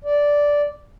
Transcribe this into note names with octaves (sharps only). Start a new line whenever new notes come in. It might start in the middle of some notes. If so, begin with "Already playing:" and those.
D5